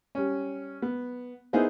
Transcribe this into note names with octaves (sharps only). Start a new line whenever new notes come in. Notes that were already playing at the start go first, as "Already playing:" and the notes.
G3 C#4
B3
B3 D#4 E4 G#4 A#4 C5